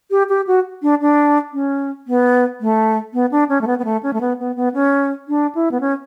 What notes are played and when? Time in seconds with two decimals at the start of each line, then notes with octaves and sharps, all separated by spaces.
0.11 G4
0.29 G4
0.47 F#4
0.82 D4
1.01 D4
1.53 C#4
2.07 B3
2.61 A3
3.14 B3
3.32 D4
3.49 C#4
3.61 A3
3.67 B3
3.79 B3
3.85 A3
4.03 C#4
4.13 A3
4.21 B3
4.39 B3
4.56 B3
4.74 C#4
5.28 D4
5.55 E4
5.72 B3
5.81 C#4